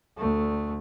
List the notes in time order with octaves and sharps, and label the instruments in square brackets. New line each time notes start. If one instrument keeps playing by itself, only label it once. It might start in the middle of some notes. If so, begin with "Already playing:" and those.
[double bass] D2 A3